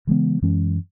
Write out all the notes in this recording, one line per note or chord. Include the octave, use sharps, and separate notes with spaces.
C#3 E3 G#3 B3
F#2 E3 G#3 C#4